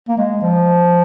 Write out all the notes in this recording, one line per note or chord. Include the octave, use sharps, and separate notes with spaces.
A#3
G#3
F3